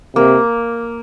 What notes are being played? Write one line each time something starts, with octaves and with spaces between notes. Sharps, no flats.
C3 A#3